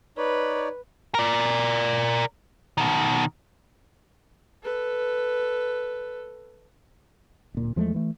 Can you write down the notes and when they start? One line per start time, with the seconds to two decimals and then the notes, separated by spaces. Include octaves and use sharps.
0.17 D#4 B4 C#5 D5
1.15 A#4 D5
2.78 B2 D#3
4.63 A4 B4
7.54 D1 A#2
7.76 E2 F3 G#3 A3
7.94 E3 A3